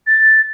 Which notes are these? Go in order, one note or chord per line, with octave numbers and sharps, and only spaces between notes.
A6